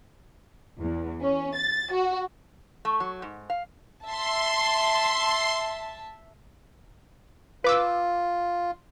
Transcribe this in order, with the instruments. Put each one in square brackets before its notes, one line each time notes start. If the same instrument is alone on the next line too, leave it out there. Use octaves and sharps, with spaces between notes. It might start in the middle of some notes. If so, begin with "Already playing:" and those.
[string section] E2
C#4
A6
F#4
[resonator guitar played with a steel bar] A3
F#3
G#2
F5
[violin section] E5 A5 [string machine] C6
[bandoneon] F4 [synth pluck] B4 D6 E6